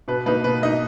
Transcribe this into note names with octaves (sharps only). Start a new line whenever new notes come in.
B2 B4
A#3 D#4 B4
B2 B4
A#3 D#4 D#5